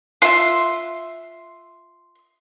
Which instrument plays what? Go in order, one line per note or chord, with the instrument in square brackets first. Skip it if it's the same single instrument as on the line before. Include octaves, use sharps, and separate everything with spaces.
[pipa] F4 E5 [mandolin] C6